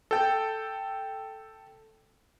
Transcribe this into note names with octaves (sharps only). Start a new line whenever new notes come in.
A4 G5